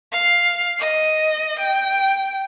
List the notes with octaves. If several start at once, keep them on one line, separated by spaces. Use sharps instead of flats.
F5
D#5
G5